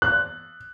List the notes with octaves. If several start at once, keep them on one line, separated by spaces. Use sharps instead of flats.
F#6